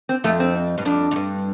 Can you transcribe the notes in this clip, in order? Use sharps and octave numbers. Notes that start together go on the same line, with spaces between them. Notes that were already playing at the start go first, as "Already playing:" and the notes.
C4
F2 A3
C4
G2
F2 D4
F2
G2